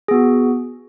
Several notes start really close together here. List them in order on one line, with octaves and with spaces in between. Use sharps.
G#4 B3 F#4